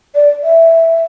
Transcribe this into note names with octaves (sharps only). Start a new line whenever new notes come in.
D5
E5